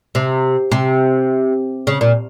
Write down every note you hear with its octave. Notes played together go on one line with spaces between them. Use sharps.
C3
C3
C#3
A#2